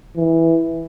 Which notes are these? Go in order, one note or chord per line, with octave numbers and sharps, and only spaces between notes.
E3